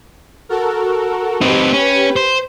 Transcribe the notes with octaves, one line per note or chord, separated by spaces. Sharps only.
F#4 A4 A#4
C4 D#4 G4 B4 B6
C#4
C5